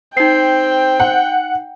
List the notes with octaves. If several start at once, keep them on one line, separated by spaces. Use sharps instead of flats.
C4 D#4 G5 C7
F#5